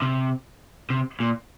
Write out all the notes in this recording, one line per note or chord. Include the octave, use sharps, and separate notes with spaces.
C3
C3
A#2